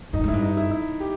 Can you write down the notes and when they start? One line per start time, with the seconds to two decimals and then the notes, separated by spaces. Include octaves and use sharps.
0.13 G2 D#4
0.24 G#2 E4
0.34 G2
0.42 D#4
0.57 E4
0.71 E4
1.00 G4